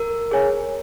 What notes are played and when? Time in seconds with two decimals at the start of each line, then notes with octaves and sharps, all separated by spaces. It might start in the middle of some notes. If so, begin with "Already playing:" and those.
Already playing: A#4
0.31 G#4 C#5 G#5